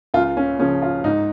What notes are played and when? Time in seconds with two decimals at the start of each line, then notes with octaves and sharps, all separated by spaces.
0.14 C#2 F4
0.37 C#4
0.59 C#3 F3 C#4
0.82 F4
1.04 G#2 D#4